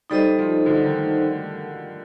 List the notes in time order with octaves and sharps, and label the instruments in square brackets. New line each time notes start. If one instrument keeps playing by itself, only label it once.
[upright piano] G3 [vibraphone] D#4 A4 C5 D#5
[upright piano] F3
D3
D#3